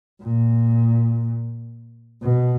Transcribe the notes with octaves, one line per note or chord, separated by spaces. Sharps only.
A#2
B2